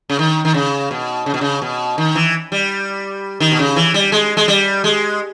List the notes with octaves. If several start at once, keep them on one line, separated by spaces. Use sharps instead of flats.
C#3
D#3
D#3
C#3
B2
C#3
B2
C#3
B2
D#3
E3
G3
D#3
B2
C#3
E3
G3
G#3
G#3
G3
G#3